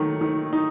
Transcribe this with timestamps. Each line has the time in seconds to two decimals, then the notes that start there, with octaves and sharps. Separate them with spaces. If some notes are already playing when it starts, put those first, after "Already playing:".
Already playing: D#3 F#3 A3
0.21 D#3
0.53 D#4